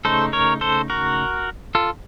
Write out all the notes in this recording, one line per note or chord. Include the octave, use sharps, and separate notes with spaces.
C#3 A3 D#4 A4 C5
A#4 C#5
A4 C5
F#4 A#4
F4 A4